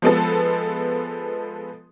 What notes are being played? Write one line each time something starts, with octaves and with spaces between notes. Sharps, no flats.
F3 G#3 B3 A4